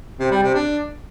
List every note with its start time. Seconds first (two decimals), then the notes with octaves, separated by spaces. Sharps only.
0.19 C3
0.31 G3
0.43 C3
0.54 D4